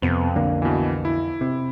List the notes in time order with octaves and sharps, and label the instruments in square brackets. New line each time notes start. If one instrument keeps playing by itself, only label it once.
[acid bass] F2 [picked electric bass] C3 B3
[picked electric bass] B1 D3 A#3
[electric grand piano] B2 E3
E4
[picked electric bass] C3